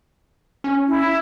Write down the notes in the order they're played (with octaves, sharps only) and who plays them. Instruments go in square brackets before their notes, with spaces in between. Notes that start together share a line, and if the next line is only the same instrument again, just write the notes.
[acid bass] C#4
[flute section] E4